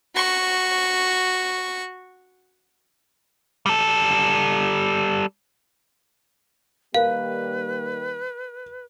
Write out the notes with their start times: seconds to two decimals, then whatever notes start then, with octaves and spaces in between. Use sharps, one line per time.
0.15 F#4 C#6
3.66 G3 A4
6.94 D#3 G3 A#3 A#4 B4 F5